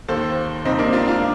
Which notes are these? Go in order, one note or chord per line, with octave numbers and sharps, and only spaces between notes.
D#2 D#3 A4 C5
G1 F2 C3 C4 D#4
A#3 D4
D4 F4
D4 F4